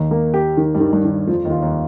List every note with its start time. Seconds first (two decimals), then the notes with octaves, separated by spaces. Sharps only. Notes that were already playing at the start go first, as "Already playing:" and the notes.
Already playing: D#2 D#3
0.11 A#3
0.34 G4
0.57 D#3
0.74 G2 G3
0.80 D#3
0.92 G2 G3
1.05 D#3
1.27 F2 F3 F4
1.45 D#2 D#3
1.50 F4
1.62 D#2 D#3